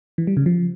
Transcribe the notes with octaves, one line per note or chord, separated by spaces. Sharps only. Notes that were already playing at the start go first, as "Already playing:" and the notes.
E3
G3
C#3
F3